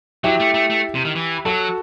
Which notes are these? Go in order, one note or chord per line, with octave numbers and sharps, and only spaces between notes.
F#3 E4 G4
A3
A3
A3
C3
D#3
E3
F#3 F#4 A4